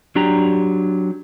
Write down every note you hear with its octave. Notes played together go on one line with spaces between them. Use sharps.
F#3 D4 G4 A#5